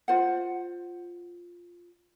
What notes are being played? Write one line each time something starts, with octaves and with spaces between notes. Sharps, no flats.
F4 C5 F#5